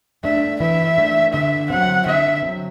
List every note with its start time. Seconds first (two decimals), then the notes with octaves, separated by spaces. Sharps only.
0.24 A3 D4 E5
0.60 E3 E5
0.97 A3 D4
1.33 D3 E5
1.70 F#3 C4 F#5
2.06 D3 E5
2.43 F#3 C4